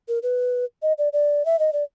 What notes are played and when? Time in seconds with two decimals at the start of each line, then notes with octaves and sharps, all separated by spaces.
0.08 A#4
0.23 B4
0.82 D#5
0.98 D5
1.13 D5
1.45 E5
1.59 D#5
1.73 D5